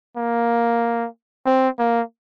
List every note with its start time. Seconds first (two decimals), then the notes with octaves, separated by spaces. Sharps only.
0.17 A#3
1.46 C4
1.79 A#3